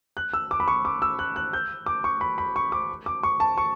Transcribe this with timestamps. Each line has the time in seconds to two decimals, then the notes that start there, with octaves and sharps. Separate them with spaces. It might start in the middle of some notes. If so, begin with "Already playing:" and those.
0.17 F#6
0.33 E6
0.51 D6
0.60 B5
0.68 C#6
0.85 D6
1.02 E6
1.19 F#6
1.36 F#6
1.53 G6
1.86 D6
2.04 C#6
2.21 B5
2.38 B5
2.56 C#6
2.72 D6
3.06 D6
3.23 C#6
3.40 A5
3.58 C#6